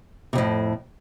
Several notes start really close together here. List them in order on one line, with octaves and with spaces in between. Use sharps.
C3 F2 A2